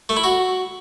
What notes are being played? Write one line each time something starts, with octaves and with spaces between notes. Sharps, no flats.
A3
E4
F#4